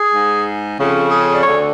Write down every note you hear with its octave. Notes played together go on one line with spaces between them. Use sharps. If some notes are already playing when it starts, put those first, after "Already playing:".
Already playing: G#4
G#2
F2 C#3
G#4
D5
D2 D3 C#5